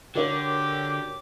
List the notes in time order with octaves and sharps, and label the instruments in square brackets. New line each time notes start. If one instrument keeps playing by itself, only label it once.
[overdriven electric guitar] D3 [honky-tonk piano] F#4 A#4 C#5 [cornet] G4 [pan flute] D6